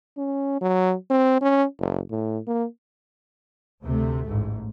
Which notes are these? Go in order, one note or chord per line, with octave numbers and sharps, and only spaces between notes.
C#4
F#3
C4
C#4
F#1
A2
A#3
D2 C3 A3
A1 G#2